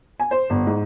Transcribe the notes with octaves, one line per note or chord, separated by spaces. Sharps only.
G#5
C5
G1
G#2